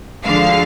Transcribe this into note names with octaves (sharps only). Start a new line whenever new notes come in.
D2 D3 F3 G#3 F5